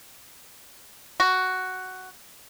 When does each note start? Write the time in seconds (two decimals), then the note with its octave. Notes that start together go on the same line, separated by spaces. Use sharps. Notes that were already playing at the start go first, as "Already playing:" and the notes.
1.20 F#4